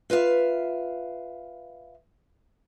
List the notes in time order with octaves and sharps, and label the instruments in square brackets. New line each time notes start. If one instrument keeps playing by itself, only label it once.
[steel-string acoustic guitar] F4 B4 E5 F5